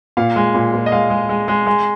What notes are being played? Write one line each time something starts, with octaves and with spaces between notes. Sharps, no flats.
A#2 F5
G#3
A#2
A#2
D#5
G#3 F5
G#3
G#3
G#3
G#3